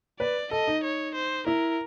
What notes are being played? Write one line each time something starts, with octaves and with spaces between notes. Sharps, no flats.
B4 D5
A4 D#5
D#4
C#5
C5
E4 A#4